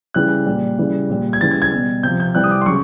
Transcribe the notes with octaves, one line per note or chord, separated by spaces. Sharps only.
C#3 E3 G3 F#6
A#2 G3
C#3 E3 G3
A#2 G3
G#6
C#3 E3 G3 A6
G#6
G#6
B2 G3
C3 F3 G6
G6
C3 E3 G3 F#6
D#6
D6
C6
C#3 F#3 C#6